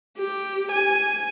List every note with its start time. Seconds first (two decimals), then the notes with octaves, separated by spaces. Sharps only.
0.17 G4
0.72 G#5